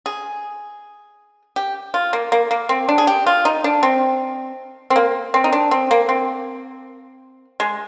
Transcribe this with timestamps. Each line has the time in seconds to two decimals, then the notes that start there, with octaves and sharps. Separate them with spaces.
0.06 G#4
1.56 G4
1.94 F4
2.13 A#3
2.32 A#3
2.51 A#3
2.69 C4
2.89 D4
2.98 G#4
3.07 G4
3.26 F4
3.45 D#4
3.64 D4
3.83 C4
4.90 C4
4.96 A#3
5.34 C4
5.44 D#4
5.52 D4
5.71 C4
5.91 A#3
6.09 C4
7.60 G#3